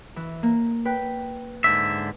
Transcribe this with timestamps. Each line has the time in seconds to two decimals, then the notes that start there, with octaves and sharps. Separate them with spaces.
0.16 E3
0.43 A#3
0.85 B4 G5
1.64 G#2 D3 E5